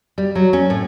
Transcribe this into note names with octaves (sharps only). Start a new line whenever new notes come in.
G3
F#3
C#4
A2